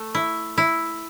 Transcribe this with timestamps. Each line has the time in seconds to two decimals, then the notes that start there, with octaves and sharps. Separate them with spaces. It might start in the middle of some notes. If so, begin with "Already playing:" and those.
Already playing: A3
0.15 E4
0.58 E4